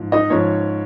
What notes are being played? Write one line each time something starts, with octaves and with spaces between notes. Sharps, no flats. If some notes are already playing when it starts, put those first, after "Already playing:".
Already playing: G#2 F3
D#4 D#5
G#2 F3 C#4 C#5